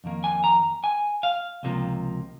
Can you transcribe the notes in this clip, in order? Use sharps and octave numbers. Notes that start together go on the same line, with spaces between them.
F2 D#3 A#3
G#5
A#5
G#5
F5
C#2 C3 F3 A#3